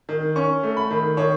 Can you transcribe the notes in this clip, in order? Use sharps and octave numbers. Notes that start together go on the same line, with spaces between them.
D#3
C#4 C#6
A3
B5
D#3
D#3 C#5